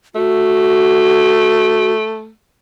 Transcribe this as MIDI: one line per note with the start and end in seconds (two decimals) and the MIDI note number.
0.15 2.31 57
0.15 1.92 66